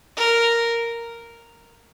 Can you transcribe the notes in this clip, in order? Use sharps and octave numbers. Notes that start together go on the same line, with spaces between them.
A#4